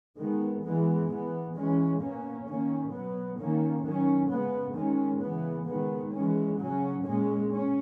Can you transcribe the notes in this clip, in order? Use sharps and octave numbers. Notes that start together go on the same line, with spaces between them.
D#3 G#3 B3
E3 G#3 B3
E3 B3
E3 G#3 C#4
B2 A#3 C#4
D#3 A#3 C#4
B2 F#3 B3
D#3 A#3 C#4
D#3 F#3 C#4
C#3 G#3 B3
D#3 G#3 C#4
C#3 E3 B3
D#3 G#3 B3
E3 G#3 C#4
C#3 F#3 C#4
A#2 G#3 C#4
C#4